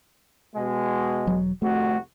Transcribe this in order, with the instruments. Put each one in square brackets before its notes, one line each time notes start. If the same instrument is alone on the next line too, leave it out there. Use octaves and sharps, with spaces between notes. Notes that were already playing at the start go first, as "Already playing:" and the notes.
[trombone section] B2 G#3
[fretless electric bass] E1 F#3
[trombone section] C2 F2 F#4 [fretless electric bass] A3